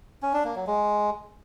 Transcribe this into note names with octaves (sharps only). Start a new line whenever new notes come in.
C#4
D4
A#3
F#3
G#3